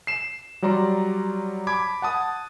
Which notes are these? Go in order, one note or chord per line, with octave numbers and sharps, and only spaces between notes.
C7 E7
F#3 G3 D5 A#5 C6
A5 B5 D6 G#6
F#5 A5 D#6